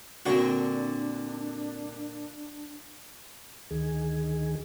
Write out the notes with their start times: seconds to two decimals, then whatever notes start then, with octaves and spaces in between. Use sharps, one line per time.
0.26 A#2 D3 C4 D4 F#4 A#4
3.71 D2 D#3 G#4